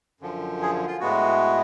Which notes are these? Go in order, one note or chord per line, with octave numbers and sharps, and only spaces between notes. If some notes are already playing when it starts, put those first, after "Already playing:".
F#2 D3 F3
G#4
F4
A2 G#3 B3 F#4